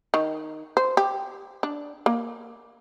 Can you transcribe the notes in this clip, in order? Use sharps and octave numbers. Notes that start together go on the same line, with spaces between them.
D#3
C5
G4
D4
A#3